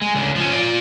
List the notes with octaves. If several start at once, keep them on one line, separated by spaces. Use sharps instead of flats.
G#3
C#2 D3
F3 C#4
F4 D5